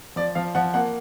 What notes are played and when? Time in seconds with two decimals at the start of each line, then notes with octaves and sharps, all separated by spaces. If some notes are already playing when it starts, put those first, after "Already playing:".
0.16 F3 D5
0.35 F3 F5
0.55 F3 F#5
0.74 A#3 F#5